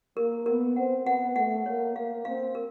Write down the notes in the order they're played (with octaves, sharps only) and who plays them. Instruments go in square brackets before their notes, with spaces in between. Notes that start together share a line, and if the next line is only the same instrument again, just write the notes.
[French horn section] A#3 [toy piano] A#4
[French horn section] B3 [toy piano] A#4
[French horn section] C4 [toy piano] F#5
[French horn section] B3 [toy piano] F#5
[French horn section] A3 [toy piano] F#5
[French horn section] A#3 [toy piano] C#5
[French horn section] A#3 [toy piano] F5
[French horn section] C4 [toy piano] F5
[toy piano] A#4